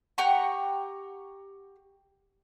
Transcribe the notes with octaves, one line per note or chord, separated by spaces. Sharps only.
G4 F#5 A#5 C#6